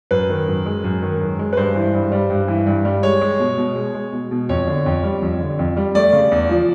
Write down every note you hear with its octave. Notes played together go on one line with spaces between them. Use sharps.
F#2 B4
D#3
F#2
G#3
F#2
D#3
F#2
G#3
B4
G2 C5
E3
G2
G3
G2
E3
G2
G3
G#3 C#5
G#3
B2
B2
G#3
G#3
B2
B2
F2 C#5
D3
F2
G3
F2
D3
F2
G3
A3 D5
C#3
E2
F3